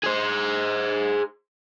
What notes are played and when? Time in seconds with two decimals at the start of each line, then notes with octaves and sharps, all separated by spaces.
0.04 G#4 C5